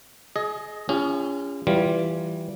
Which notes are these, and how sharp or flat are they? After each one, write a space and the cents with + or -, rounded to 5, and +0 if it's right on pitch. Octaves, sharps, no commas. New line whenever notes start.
G#4 +25 D#5 +0
C#4 +20 F4 -40 G#4 -45
E3 +5 G3 -15 F4 +0